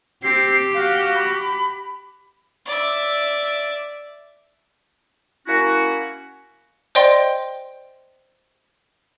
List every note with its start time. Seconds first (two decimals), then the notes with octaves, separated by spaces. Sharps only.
0.23 C4 G4 C7
0.74 F#4 F5
1.15 B5
2.66 D5 E5
5.47 A#3 C#4 E4 F#4
6.95 C5 D5 D#5 G5 C6